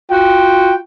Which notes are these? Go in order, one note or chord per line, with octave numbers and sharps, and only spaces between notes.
F4 F#4 G5